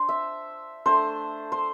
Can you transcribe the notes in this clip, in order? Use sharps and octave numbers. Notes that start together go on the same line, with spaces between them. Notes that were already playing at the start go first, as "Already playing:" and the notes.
Already playing: D4 C5
E5
A3 D4 C5
C5